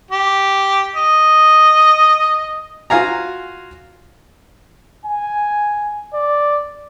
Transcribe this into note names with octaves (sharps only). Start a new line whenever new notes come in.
G4
D#5
F4 F#4 F5 G#5 A#5
G#5
D5